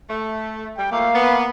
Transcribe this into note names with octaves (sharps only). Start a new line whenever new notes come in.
A3
G3 G5
F3 F#3 A3 A#3 F5
B3